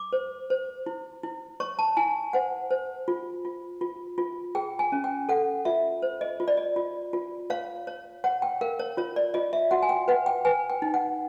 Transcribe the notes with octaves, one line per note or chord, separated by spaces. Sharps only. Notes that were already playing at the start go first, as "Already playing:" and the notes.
Already playing: D6
C5
C5
E4
E4
C#5 C#6
A5
E4 G#5
C5 F#5
C5
F4
F4
F4
F4
G#4 G5
G#5
C#4
G5
A4 F#5
F4 E5
C5
D#5
F4
D5
D#5
F4
F4
C#5 F5
C#5
C#5 F#5
G5
A#4 F5
C#5
F4 C#5
D5
F4 D#5
E5
F#4 F#5
G#5
G5
B4 F#5
G5
B4 G#5
G5
D#4
F#5